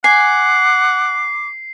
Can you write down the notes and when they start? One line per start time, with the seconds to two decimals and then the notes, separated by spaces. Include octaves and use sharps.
0.04 F#5 G#5 D6 C7